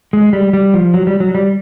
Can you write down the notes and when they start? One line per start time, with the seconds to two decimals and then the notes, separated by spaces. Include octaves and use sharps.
0.13 G#3
0.33 G3
0.53 G3
0.74 F3
0.94 F#3
1.07 G3
1.20 F#3
1.35 G3